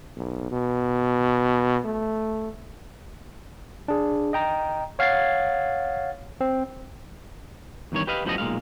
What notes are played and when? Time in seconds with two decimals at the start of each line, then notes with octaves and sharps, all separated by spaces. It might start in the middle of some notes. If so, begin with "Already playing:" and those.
0.17 B1
0.51 B2
1.85 A3
3.88 D4 G#4
4.33 D#5 G5 A#5
4.99 C#5 F5 F#5 G#6 A6 C7
6.41 C4
7.92 E2 G2 D#3 C#5
8.07 G4 B4 D#5 F5
8.25 F#2 A2 F3 G3 B3 D#5
8.38 B1 A#2 F3 G#3 F5